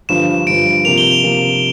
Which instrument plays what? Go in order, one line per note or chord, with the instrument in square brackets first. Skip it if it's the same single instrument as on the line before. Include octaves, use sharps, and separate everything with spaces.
[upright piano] G1 G2 F3 [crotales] E7
[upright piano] G1 G2 F3 [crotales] D7
[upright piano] C3 F3 A#3 [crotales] F7
[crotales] G7
F7
[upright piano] C3 F3 A#3